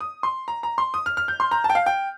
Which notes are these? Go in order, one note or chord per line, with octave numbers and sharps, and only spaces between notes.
D#6
C6
A#5
A#5
C6
D#6
F6
F6
G6
C6
A#5
A5
G5
F5
G5